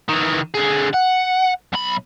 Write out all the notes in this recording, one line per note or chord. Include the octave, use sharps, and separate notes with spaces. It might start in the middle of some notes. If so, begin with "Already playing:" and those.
D#3 E3
D3 G#4
F#5
B1 B5